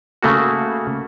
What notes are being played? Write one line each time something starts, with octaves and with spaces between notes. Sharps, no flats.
C#3 A3 A#3 F#4